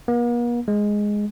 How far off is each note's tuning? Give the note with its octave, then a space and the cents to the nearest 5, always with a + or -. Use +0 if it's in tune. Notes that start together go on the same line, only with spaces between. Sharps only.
A#3 +45
G#3 +0